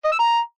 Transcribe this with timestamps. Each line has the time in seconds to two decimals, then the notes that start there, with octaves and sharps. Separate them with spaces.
0.05 D#5
0.12 E6
0.19 A#5